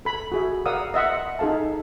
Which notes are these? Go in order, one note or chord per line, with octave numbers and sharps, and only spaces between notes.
A4 B5
F#4 G#4 E5
A#4 D5 F5 F#5 D#6 E6
D#5 E5 F#5 C6
D#4 G#4 A4 F5 A5